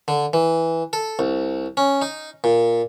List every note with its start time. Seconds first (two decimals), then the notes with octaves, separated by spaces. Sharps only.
0.08 D3
0.33 E3
0.93 A4
1.19 C2
1.77 C#4
2.02 D#4
2.44 A#2